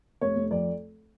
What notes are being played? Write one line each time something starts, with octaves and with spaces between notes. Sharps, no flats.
F1 C#5
F1
F2 D5